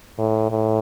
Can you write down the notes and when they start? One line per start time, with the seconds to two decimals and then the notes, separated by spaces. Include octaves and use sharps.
0.19 A2
0.50 A2